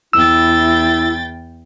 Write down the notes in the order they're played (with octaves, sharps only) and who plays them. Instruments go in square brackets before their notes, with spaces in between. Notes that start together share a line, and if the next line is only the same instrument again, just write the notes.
[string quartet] E2 G5 A6 [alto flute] E4 [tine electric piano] E6